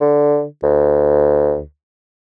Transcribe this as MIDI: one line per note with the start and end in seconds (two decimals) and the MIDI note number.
0.01 0.44 50
0.63 1.61 38